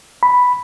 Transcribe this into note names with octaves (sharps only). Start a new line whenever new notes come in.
B5